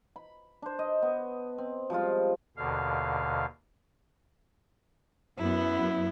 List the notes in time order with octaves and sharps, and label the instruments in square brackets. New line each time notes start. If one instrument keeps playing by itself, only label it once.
[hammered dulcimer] B5
D4 C5
D#5
B3
C4
F3 G3 G#3 F4
[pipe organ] D#2 B2 D3 F5
[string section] F#2 B3 [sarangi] E4